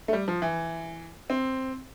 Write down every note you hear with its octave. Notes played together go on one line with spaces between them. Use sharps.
A3
G3
F3
E3
C4